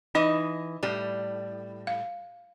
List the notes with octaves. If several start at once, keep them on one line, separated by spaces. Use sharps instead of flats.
E3 D#4 D#5
A2 G3
F5